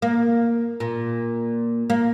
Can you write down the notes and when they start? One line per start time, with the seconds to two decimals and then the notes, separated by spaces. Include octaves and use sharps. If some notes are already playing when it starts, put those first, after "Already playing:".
0.02 A#3
0.80 A#2
1.90 A#3